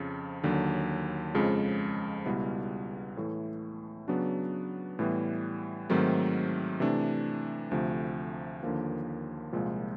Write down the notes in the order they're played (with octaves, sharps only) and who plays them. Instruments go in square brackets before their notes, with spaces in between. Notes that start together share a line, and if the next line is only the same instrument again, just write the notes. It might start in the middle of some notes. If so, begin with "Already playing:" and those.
Already playing: [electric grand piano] F2 C#3 F3
D#2 D3 F#3
F2 C#3 F3 G#3
C#2 B2 G3 B3 E4
A2 E3 A3
C#3 F#3 B3 D4 F#4
A2 E3 G3 B3
G#2 D#3 F#3 A3 C4
C3 E3 A3 D4
D2 C3 F3 A3
D#2 D3 F3 A#3
C2 A#2 F3 G#3